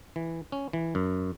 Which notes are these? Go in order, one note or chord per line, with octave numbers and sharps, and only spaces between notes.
E3
C#4
E3
F#2